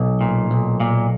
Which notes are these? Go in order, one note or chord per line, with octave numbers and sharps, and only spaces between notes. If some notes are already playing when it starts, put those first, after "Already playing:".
Already playing: B1
A#2
B1
A#2